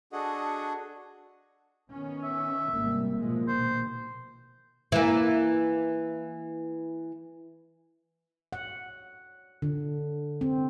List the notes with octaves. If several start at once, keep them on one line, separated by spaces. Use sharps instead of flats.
D4 F#4 G#4 A4 D#5 F#5
D#3 B3 C#4
E5
G#1 C3 G3 A#3
B2 F3 G#3
A#1 B2 D#3 C5
E3 A#3
F#5
D3
C4